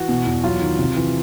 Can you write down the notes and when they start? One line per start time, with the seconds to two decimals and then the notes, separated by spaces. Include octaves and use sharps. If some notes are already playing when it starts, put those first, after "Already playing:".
Already playing: E3 F#4
0.09 B2
0.26 E2
0.44 F#3 F4
0.61 D#3
0.79 C3
0.96 E3